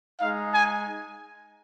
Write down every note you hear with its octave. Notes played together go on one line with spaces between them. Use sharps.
G#3 D#4 F5
G#5